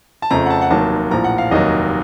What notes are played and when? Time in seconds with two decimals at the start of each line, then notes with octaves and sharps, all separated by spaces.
0.22 A5
0.31 F2 C#3 F3 A3 A#5
0.46 F#5
0.50 A5
0.61 F#5
0.71 F1 D#2 D#3 F#3 A5
1.11 A#1 A2 F3 A#5
1.24 F#5
1.38 F5
1.51 F1 D#2 D#3 F#3 D#5